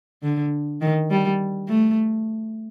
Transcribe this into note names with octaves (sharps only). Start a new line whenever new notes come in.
D3
D#3
G3
A3